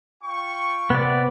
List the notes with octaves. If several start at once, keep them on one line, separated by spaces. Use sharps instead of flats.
F4 G5 C#6
C3 B3 D5